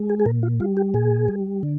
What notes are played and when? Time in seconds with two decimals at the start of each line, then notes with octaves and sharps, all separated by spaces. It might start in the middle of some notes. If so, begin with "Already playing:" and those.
Already playing: G#3
0.10 G#4
0.20 G#4
0.26 A#2 A#4
0.43 F4
0.60 G3 F4
0.77 G4
0.94 A#2 G#4
1.28 G3
1.63 D3